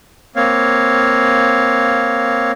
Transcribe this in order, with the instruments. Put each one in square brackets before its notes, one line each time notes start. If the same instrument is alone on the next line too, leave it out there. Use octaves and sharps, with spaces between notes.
[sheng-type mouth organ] A#3 C4 C#5 F5